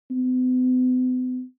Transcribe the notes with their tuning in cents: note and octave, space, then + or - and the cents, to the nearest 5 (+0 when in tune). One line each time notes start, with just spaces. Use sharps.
B3 +45